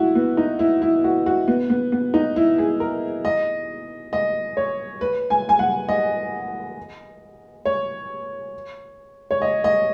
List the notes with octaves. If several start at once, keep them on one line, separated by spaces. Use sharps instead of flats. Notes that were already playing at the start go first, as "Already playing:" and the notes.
Already playing: E4 F#4
B3
D#4
E4
E4
F#4
F#4
B3
B3
B3
D#4
E4
G#4
A#4
D#5
D#5
C#5
B4
G#5
G#5
F#5
D#5
C#5
C#5
D#5
D#5